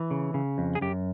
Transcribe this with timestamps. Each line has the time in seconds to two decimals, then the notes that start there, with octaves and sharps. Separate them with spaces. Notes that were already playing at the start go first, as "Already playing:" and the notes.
Already playing: E3
0.11 C#3
0.34 C#3
0.58 F2
0.75 G#4
0.81 F#2 G4